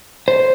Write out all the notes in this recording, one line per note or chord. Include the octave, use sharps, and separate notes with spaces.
C5